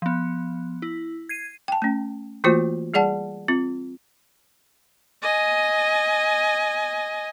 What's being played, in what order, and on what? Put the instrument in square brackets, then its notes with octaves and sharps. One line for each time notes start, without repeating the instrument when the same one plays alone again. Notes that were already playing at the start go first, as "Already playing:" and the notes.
[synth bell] F3 B3
E4
G#6 C7 D#7
[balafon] G5 A5
A3 C#4
E3 A3 A#3 F4 F#4 C5
G3 G#4 D5 F#5 A5
C4 F4
[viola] D#5 G#5